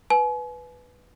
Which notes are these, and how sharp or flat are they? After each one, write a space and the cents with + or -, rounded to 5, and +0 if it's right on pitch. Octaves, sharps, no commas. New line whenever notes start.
B4 +0 G#5 +40